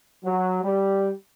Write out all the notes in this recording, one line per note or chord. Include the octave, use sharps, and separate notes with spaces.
F#3
G3